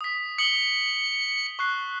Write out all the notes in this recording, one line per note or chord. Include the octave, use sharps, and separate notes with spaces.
D#6 B6
D#6 C#7 F#7 G7
C#6 F#6 C7